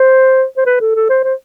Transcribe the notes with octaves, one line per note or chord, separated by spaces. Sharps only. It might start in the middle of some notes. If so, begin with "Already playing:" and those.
Already playing: C5
C5
B4
A4
A4
C5
C5